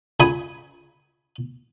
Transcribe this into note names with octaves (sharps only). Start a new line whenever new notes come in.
C#2 G#5 B5 D#6